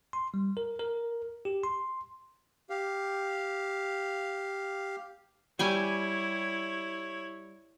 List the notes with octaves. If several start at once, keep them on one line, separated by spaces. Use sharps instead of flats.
C6
G3
A#4
A#4
G4
C6
G4 F5
G3 E4 C#5 G5 G#5